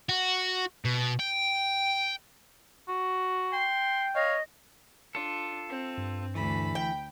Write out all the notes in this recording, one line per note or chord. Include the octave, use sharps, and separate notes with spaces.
F#4
B2
G5
F#4
G5 C6
C#5 D#5 F5
D4 F4 A4
C4
G2
D2 E3 A4 B5
G5